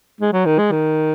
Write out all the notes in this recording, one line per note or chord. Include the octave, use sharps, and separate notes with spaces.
G#3
F#3
D#3
G#3
D#3